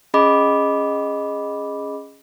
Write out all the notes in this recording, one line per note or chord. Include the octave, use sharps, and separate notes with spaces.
C#4 G#4 D#5 B5 D6